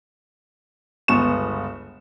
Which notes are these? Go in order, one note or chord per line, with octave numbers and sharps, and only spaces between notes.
G1 C#2 B3 C#6 E7